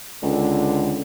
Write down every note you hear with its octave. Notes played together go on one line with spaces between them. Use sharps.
C#2 D3